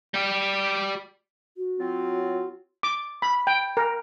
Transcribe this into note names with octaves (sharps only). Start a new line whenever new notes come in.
G3 G4
F#4
F#3 C4 F4
D6
B5
G5
A#4